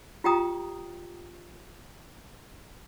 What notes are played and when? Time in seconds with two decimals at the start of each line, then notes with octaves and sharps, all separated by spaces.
0.24 F4 G4 G5 A#5 D#6